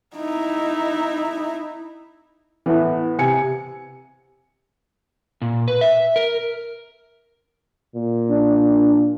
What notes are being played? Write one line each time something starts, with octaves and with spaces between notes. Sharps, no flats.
D#4 E4
A2 E3 B3
C3 G#5 C#7
A#2
B4
E5
A#4
A#2
D4